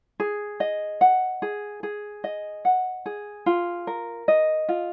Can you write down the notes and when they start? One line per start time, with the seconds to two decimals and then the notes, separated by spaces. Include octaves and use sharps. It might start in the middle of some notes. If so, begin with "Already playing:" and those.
0.20 G#4
0.60 D#5
1.01 F#5
1.42 G#4
1.83 G#4
2.24 D#5
2.65 F#5
3.06 G#4
3.46 F4
3.87 A#4
4.28 D#5
4.69 F4